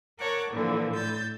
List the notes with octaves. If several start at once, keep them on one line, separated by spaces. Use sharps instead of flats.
A#4 C#5 F#5 A5 D6
A#2 D3 E3 F3
A2 E6 G6 A6